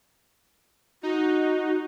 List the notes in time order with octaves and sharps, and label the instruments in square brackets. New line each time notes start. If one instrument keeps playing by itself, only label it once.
[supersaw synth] D#4 [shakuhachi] F#4